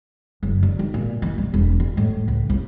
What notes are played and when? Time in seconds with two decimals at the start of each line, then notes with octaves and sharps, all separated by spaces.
0.43 F#1
0.63 D3
0.79 D#3
0.94 A#2
1.22 E3
1.38 C2
1.54 E1
1.80 E3
1.97 A2
2.28 C#2
2.49 C2